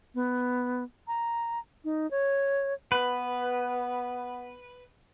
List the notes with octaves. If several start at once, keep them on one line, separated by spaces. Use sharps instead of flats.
B3
A#5
D#4
C#5
B3 B4